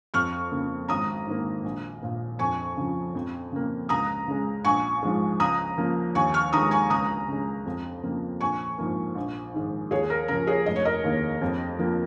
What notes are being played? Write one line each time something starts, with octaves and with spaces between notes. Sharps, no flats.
F2 C#6 F6
C#3 A#3
G#1 A#5 D#6
G#2 D#3 A#3
A#1
A#2 A#3
F2 G#5 C#6
C#3 F3
F2
C#3 A#3
C#2 A#5 D#6
C#3 G#3
A#1 G#5 C#6
G#2 F3 G#3
C#2 A#5 D#6
C#3 F3 A#3
D#2 G#5 C#6
C#6 F6
D#3 G#3 A#5 D#6
G#5 C#6
C#2 A#5 D#6
C#3 G#3
F2
C#3 F3 A#3
A#1 G#5 C#6
G#2 F3 A#3
A#1
G#2 D#3 G#3
D#2 G#4 C#5
A#4
C#3 F3 A#4
G#4 C#5
F1 D#5
C#5
A#4 D#5
D#2 D#3 A#3
F2
F3 A#3